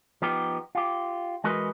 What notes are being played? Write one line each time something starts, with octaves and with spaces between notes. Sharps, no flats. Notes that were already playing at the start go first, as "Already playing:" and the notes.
F3 B3 D#4 G4
F4 G4
E3 G#3 F#4 A#4 B4 D#5